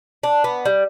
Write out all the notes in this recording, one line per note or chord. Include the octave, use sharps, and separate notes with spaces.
D4
B3
G3